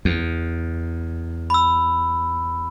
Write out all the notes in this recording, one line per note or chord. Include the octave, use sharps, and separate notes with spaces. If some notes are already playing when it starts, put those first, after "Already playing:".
E2
B5 E6